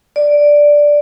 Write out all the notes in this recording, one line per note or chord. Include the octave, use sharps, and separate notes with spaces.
D5